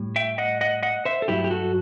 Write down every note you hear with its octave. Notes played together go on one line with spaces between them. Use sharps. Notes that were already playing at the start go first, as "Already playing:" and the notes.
Already playing: A2 G3
E5 G5
D#5 F#5
D#5 F#5
D#5 F#5
C5 E5
A4
G2 F#3 A3 E4 G4
G4
F#4 A4